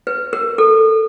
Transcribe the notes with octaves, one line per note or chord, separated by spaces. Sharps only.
B4
A#4
A4